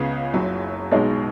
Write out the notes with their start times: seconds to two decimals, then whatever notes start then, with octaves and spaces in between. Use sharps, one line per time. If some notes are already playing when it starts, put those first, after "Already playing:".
Already playing: C#2 C#3 B3 G#4
0.34 F#1 F#2 F#3
0.92 B1 B2 G#3 D#4 G#4